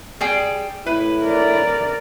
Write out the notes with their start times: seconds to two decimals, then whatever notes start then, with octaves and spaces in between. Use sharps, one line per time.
0.21 G3 G#4 G5
0.86 A2 E4 B4
1.23 A#4 D5